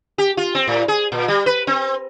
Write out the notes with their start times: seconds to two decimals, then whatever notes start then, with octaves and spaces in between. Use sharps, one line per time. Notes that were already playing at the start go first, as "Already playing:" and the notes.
0.18 G4
0.37 F4
0.55 C4
0.67 A2
0.88 G#4
1.12 A#2
1.28 G3
1.46 B4
1.67 C4